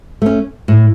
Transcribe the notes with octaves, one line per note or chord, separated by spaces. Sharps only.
A3 C#4
A2